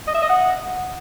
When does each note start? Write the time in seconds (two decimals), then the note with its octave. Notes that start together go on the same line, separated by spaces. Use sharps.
0.07 D#5
0.15 E5
0.22 D#5
0.29 F#5